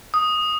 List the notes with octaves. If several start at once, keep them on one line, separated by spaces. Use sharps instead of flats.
D#6